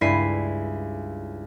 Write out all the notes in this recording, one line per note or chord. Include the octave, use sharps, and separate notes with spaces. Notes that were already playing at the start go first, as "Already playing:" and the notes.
C#2 G2 E4 B6 C7 D#7